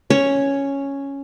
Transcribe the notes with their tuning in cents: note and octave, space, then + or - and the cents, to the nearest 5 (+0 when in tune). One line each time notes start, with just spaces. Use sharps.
C#4 +0 C#5 +0